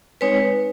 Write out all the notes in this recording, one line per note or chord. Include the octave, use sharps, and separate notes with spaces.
G#3 C4 D#4 B4 C#5